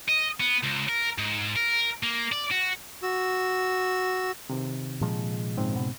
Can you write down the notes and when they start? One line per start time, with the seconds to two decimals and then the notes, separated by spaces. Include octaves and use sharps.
0.09 D#5
0.40 B3
0.63 C#2
0.89 A#4
1.18 G#2
1.56 A#4
2.03 A#3
2.32 D5
2.51 F#4
3.03 F#4 E6
4.50 C3 D#3
5.01 A#2 F3 G#3
5.57 G#2 C#3 C4
5.76 B2